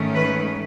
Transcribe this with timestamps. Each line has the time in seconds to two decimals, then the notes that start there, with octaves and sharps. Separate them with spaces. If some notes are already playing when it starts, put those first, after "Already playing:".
Already playing: G#2 D#3 A3 C#4
0.13 B4